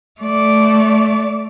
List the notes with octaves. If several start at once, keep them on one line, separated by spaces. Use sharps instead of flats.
A3 D5